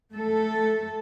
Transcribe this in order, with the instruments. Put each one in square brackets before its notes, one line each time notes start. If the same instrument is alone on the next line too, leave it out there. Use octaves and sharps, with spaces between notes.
[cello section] A3 A4